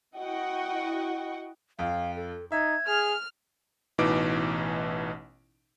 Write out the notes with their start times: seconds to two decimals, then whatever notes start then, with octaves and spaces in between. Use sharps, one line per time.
0.16 E4 F#4 D#5 F#5 G5 C#6
1.79 F2 F4 F5
2.16 A4
2.52 D#4 E5 G#6
2.87 G#4 F6
3.98 A1 B2 E3 D#4 D6 D7